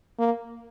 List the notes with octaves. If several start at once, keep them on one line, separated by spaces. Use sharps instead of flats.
A#3